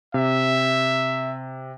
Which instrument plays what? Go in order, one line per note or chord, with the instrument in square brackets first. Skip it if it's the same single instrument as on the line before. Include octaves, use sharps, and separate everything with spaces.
[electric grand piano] C3 [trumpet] E5